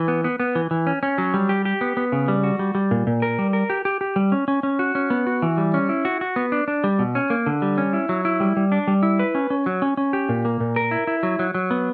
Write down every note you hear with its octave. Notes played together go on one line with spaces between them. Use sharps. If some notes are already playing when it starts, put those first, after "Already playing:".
Already playing: E3
B3
B3
B3
E3
E3
C#4
C#4
F#3
G3
G4
G4
B3
B3
C#3
G3
F#4
G3
G3
A#2
A#2
A#4
G3
A#4
G4
G4
G4
G3
C#4
C#4
C#4
F#4
C#4
B3
F#4
E3
G3
C#4
E4
F#4
F#4
B3
D4
D4
G3
B2
C#4
A#3
D3
G3
C#4
E4
F#3
E4
G3
G3
D4
G3
E4
B4
C#4
C#4
F#3
C#4
C#4
G4
A#2
A#3
A#2
A#4
E4
E4
F#3
F#3
F#3
B3